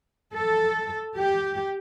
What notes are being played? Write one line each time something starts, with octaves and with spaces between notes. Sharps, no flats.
A4
G4